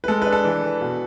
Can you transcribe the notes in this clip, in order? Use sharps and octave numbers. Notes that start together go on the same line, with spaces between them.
B4
G#3 A4
B4
D4
A4
E3
E3
B2